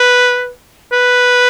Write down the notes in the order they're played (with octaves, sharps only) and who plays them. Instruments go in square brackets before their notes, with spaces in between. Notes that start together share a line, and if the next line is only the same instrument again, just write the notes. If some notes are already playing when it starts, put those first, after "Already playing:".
Already playing: [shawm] B4
B4